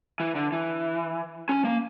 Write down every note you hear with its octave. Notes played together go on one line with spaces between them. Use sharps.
E3
D3
E3
C#4
A#3